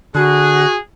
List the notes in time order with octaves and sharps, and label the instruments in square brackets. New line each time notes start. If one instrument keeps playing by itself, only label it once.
[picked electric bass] D3 [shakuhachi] F#4 [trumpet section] G#4 [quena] F#6